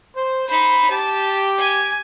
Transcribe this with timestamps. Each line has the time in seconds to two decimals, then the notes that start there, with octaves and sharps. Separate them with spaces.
0.15 C5
0.48 D#4 C5 B5
0.90 G4 A5
1.58 G#5